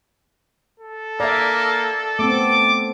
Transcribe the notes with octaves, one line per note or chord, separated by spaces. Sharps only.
A4
A#3 D5 E5
A3 B3 C4 D6